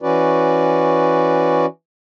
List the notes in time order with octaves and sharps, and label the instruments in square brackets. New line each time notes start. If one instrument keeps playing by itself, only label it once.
[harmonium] E3 C#4 F#4 B4 D5